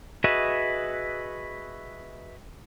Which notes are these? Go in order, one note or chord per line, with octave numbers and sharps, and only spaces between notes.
F#4 G#4 B4 D#5 E5